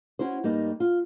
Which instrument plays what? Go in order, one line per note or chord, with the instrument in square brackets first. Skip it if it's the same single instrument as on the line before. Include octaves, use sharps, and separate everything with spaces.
[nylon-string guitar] C#4 E4 F#4 C5
G2 G3 A#3 D#4
F4